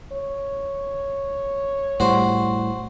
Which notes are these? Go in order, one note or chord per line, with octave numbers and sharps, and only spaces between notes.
C#5
A2 G3 F#4 C5